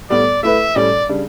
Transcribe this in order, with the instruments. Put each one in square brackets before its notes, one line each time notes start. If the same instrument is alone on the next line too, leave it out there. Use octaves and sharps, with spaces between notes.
[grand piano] A2 G3 B3 [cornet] D5
[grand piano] A3 E4 B4 [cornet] E5
[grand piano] A2 G3 C#4 [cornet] D5
[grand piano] C#3 G3 D4